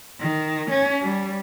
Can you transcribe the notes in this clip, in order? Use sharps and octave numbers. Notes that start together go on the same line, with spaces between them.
D#3
C#4
G3